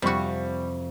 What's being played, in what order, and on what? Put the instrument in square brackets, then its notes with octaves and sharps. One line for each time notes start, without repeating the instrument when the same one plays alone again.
[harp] F2 [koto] C3 F#4 [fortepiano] G3 C#6